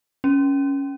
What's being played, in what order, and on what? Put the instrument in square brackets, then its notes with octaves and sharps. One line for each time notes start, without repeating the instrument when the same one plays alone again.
[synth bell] C#4